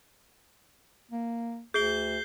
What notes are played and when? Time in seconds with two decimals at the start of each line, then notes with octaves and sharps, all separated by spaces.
1.11 A#3
1.74 D2 G#4 G6 C7 G7